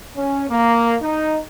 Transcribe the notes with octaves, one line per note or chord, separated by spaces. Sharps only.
C#4
A#3
D#4